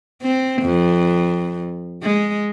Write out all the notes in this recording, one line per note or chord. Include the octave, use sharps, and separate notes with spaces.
C4
F2
G#3